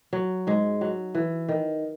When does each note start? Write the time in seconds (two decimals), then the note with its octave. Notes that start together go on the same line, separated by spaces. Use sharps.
0.13 F#3
0.47 G#2 G#3
0.81 F#3
1.15 E3
1.49 D#3